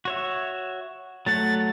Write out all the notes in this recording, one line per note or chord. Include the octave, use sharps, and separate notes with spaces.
F#4 C#5 E5
F#3 A3 F#5 A6